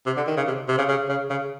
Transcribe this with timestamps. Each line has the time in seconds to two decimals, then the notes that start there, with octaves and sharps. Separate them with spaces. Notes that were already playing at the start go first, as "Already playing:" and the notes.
0.06 C3
0.17 D3
0.27 D#3
0.37 C#3
0.47 C3
0.68 C3
0.78 C#3
0.89 C#3
1.09 C#3
1.30 C#3